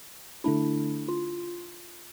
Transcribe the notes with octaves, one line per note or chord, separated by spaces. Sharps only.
D3 A3 D4 E4
F4